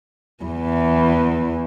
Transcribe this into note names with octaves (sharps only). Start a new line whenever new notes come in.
E2 E3